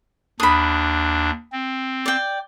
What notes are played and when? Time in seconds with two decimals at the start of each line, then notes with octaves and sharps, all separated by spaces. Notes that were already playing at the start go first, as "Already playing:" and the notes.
0.40 D#2 D4 B5 D#6
1.52 C4
2.06 D5 G5